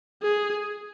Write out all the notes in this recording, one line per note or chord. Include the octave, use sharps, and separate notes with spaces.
G#4